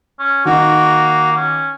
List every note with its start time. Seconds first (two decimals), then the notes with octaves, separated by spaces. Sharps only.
0.19 C#4
0.45 D#3 A#3 D#4 F#4
1.36 C#4